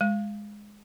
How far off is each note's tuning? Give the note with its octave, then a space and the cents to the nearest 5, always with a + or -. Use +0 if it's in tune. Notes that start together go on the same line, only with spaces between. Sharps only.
G#3 +0